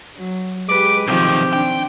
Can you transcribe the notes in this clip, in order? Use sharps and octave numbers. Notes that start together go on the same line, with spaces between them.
F#3
G#3 G4 B4 D6
B1 D#3 F3 C4 G4
D4 G5